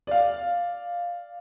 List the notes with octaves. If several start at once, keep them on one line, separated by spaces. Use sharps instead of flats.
D5 F5